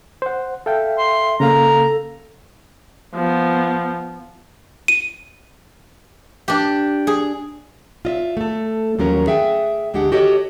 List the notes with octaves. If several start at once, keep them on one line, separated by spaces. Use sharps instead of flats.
C5 F#5
A4 E5 F5 G5
C6
C#3 A#3 A4 F5 A#5
F3 B3
D#7
D4 G4
G#4
F4 D#5 E5
A3 A4
D#2 F3 F#3 C#4 A#4
G#4 E5 F#5 G5
D2 G#3 D4 G4 F#5
F#4 G4 A4 C#5 D#5